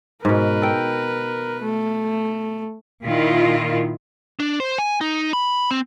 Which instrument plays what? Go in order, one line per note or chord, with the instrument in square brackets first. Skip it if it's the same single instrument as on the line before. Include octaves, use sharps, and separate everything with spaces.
[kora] G#2 B2 [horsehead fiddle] A#4 B4
[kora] A4 G5
[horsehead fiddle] A3
[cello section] A#2 D#3 E4 F4
[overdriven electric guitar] D4
C5
G#5
D#4
B5
C4